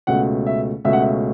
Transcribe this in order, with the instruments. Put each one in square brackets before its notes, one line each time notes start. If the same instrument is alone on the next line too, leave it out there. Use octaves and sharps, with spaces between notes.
[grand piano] C#2 B2 A3 C#4 F#5
E5
C#2 B2 A3 C#4 E5
F#5
E5